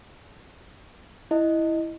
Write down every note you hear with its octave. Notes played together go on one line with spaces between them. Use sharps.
E4 D#5